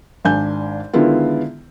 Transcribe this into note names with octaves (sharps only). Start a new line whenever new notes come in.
G#1 D4 G#5 G6
D3 D#3 G#3 B3 E4 F4